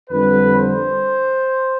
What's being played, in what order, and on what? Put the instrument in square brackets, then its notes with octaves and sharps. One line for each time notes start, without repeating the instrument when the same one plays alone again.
[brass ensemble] F2 D3 G3 B4
C5